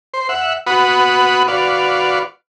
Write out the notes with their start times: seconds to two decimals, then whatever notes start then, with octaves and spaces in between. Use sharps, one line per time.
0.14 C5
0.29 E5 F#5
0.67 F#4 B4 F#5 B5 D#6
1.48 F#4 B4 D5 F5